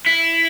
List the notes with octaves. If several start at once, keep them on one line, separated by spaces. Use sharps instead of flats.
E4